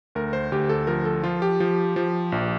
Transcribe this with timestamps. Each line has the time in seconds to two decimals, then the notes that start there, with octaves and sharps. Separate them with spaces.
0.15 D2 A#4
0.33 C5
0.52 D2 G4
0.69 A4
0.87 F3 A#4
1.05 A4
1.24 F3 F4
1.42 G4
1.60 F3
1.96 F3
2.32 A#1